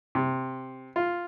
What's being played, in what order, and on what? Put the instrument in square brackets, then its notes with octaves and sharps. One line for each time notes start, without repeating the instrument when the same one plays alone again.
[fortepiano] C3
F4